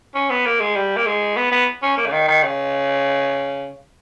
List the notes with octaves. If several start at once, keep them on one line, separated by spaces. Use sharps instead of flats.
C#4
B3
A#3
G#3
G3
A#3
G#3
B3
B3
C#4
A#3
C#3
D#3
D#3
C#3